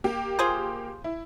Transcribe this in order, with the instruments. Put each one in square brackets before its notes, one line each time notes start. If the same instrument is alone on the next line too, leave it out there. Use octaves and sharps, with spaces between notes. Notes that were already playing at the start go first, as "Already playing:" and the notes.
[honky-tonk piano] A#3 G4
[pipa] F4 G#4 C5
[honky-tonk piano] E4